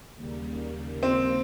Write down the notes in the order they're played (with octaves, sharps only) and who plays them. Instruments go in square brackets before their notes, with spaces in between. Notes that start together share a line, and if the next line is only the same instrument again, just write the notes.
[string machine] D#2 C#3 G3 A#3
[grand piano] C4